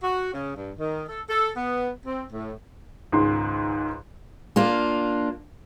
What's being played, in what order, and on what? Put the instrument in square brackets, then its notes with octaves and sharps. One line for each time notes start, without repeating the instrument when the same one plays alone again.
[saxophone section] F#4
C#3
G2
D#3
A4
A4
B3
C4
A2
[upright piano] C#2 G#2 D#3 C6
[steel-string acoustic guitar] A#3 D4 F4